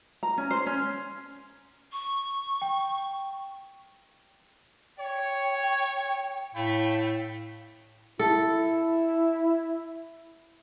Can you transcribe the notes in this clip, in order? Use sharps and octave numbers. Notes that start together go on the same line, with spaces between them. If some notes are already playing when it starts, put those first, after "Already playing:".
A#5
C#4
C5
C#4
C#6
G5
C#5 G5
A2 A3 F5 G5 B5
E4 A4